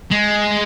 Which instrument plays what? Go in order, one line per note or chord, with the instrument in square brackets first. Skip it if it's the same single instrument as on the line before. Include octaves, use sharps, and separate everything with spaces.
[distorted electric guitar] G#3